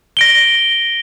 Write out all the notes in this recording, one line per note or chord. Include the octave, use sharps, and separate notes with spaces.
A#6 D7 G7